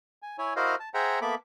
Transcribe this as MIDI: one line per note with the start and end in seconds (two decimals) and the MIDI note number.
0.22 0.37 80
0.38 0.54 64
0.38 0.54 73
0.38 0.54 80
0.56 0.75 64
0.56 0.75 66
0.56 0.75 70
0.56 0.75 72
0.56 0.75 75
0.56 0.75 77
0.80 0.89 81
0.94 1.19 68
0.94 1.19 72
0.94 1.19 76
0.94 1.19 78
0.94 1.19 79
0.94 1.19 82
1.22 1.35 58
1.22 1.35 59
1.22 1.35 69
1.22 1.35 76
1.22 1.35 83
1.22 1.35 86